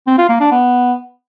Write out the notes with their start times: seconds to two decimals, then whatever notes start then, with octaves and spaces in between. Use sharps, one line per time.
0.07 C4
0.18 F4
0.29 A#3
0.40 D4
0.52 B3